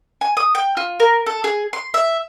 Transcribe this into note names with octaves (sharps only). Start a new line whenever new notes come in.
G#5
D#6
G5
F4
A#4
A4
G#4
C6
E5